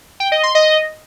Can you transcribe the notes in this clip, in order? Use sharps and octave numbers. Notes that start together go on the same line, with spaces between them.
G5
D#5
C6
D#5